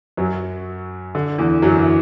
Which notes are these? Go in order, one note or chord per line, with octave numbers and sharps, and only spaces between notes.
F#2 F#3
D3
E2 E3
F#2 F#3
E3